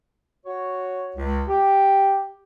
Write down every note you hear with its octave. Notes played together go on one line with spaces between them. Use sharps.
F#4 C#5
C#2
G4